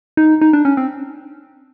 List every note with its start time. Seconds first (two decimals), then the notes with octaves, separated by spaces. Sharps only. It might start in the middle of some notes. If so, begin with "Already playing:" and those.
0.17 D#4
0.41 D#4
0.53 D4
0.65 C#4
0.77 C4